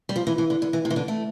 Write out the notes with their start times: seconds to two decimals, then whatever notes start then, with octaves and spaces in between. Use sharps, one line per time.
0.09 G3
0.16 F3
0.27 E3
0.38 E3
0.50 D3
0.62 D3
0.73 E3
0.85 C3
0.90 E3
0.96 D3
1.08 A3